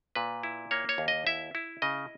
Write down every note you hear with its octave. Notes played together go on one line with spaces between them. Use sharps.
A#2 B4
E4
A#3 C#5
C#5
D#2
D#5
E4 E5
E4
C#3 D#5